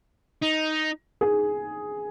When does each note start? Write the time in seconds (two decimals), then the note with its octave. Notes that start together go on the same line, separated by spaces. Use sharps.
0.42 D#4
1.21 G#4